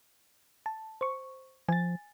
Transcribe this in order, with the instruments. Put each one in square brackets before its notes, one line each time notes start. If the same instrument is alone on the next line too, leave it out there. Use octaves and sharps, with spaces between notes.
[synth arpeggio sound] A5
C5 C#6
[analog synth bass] F3 [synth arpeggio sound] G#5 A6